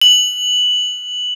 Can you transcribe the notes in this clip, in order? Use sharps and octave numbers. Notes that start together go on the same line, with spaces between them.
F#7